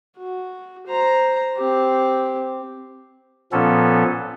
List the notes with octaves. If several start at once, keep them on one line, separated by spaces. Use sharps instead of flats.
F#4
C5 A#5
C4 G4
A#2 F3 B3 C#4 A4